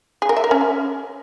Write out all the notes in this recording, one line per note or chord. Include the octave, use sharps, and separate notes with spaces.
G#4
A#4
E5
A#4
C#4